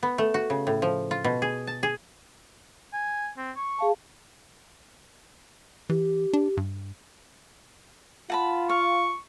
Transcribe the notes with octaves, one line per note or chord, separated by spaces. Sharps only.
B3
A3
F#4
C#3
A2
F3
F4
B2
G#4
A5
G#4
G#5
C4
C#6
G#4 F5 A5
E3 G4
D4
G2
F4 F#5 A5 B5
F5 C#6